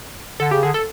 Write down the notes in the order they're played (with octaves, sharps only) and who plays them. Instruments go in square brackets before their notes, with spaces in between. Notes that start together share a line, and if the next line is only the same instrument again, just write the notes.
[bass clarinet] D3 [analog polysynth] A4
[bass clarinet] C#3 [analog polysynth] G4
[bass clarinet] D3 [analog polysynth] G#4
[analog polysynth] A4